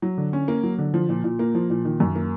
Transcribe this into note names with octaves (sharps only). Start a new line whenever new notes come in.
F#3
D3
C#4
A#3
F#3
D3
F3
A#2
A#2
A#3
F3
A#2
D#3
F#2
A#3